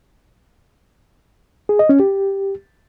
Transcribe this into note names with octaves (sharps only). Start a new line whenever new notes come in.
G#4
D#5
C#4
G4